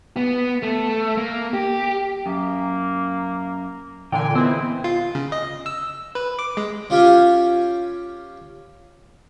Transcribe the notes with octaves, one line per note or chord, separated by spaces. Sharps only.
B3
A3
A#3
G4
F#2 A#3
A#2 D3 E3 G5 G#5
G#3 B3 C4 E4
F4
C#3
D#5
E6
B4
D6
G#3
C#4 F4 G4 F5 G5 G#5